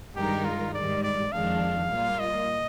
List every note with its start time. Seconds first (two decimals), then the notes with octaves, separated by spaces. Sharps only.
0.15 G2 D#3 G#3 D#4 G4 A#4
0.45 F4
0.74 G#2 D#3 G3 D5
1.03 D5
1.32 F2 D#3 G#3 D4 F5
1.90 A#2 G3 A#3 F4
2.19 D#5